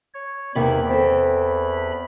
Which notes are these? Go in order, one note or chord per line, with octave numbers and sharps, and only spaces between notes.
C#5
E2 C3 D#3 A#3 B5
C4 A4